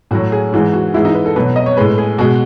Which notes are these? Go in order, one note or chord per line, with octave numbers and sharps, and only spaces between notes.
A2 F#3 F#4
G#4
G#2 E3 G#3
F#4
G#2 E3 G#3 E4
D#4
B4
A4
B2 F#3 B4
D#5
C#5
A2 G#3 B4
G#4
B2 G#3 F#4